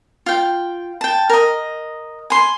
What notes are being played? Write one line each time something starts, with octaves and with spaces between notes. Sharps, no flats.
F4 G5
G5 A5
A#4 D#5
G#5 C6